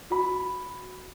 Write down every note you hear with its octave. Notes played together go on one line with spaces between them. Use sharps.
F#4 B5